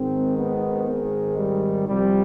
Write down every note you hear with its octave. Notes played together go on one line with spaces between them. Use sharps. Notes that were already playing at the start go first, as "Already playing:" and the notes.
Already playing: G#1 G#2 D#3 C4
B3
G#3
G3
C2 C3 F3 G3